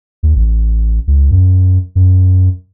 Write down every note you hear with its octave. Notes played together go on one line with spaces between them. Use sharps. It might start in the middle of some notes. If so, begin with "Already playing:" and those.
D#2
A1
C#2
F#2
F#2